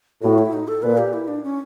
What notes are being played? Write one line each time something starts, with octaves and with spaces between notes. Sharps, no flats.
A2 F#4
E4
D#4
A4
A#2 B4
G4
E4
D4
C#4